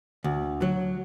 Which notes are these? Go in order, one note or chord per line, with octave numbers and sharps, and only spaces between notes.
D2
F#3